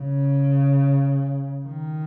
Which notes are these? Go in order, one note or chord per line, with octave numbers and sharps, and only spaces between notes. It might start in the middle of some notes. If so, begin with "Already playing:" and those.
Already playing: C#3
D#3